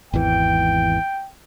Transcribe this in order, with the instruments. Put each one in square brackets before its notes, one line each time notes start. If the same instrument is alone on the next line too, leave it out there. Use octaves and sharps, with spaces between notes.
[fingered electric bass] G#1 E2 E3 [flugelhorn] G5